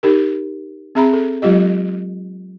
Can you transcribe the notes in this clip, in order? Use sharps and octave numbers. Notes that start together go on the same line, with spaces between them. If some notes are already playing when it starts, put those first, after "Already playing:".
D#4 G4 A#4
C4 G#4 E5 A#5 B5
A4
F#3 G#3 F4 G4 D#5